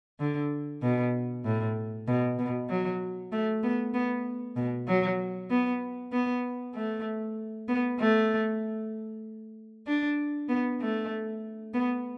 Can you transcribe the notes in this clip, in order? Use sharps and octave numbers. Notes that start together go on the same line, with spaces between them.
D3
B2
A2
B2
B2
F#3
A3
B3
B3
B2
F#3
B3
B3
A3
B3
A3
D4
B3
A3
B3